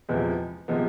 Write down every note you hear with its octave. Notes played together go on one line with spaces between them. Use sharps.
E2 C3 F3 G#3 B3
C3 F3 G#3 B3